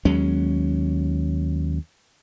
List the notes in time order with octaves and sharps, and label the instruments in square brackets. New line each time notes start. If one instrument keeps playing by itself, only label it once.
[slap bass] D#2 F#3 G#3 C#4